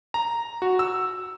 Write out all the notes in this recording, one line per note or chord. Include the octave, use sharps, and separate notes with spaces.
A#5
F#4
E6